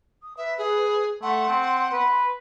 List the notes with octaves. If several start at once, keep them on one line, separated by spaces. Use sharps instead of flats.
D#6
B4 E5
G#4
A3 F#5 C6
C4
B4